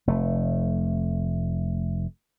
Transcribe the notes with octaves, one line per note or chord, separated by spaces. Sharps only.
F1 A3